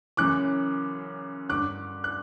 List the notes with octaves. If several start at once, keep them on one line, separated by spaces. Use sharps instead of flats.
F#2 C#3 E3 D6 F#6
G2 D3 D6 F#6
F#6